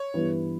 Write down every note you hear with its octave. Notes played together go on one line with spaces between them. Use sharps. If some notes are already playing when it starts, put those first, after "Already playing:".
Already playing: C#5
G2 E3 B3 E4 B4